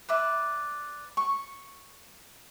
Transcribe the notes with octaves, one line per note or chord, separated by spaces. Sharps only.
B4 D5 E5
C#6